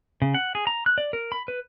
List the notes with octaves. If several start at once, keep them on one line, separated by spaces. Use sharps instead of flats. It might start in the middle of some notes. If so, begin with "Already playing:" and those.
C#3
F#5
G#4
A#5
F#6
D5
A#4
B5
B4